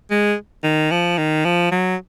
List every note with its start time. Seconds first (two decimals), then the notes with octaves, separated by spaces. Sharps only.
0.11 G#3
0.64 D#3
0.91 F3
1.18 D#3
1.45 F3
1.71 F#3